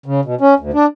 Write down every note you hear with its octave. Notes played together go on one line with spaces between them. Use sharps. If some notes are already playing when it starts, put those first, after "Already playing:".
C#3
B2
C#4
D2
D4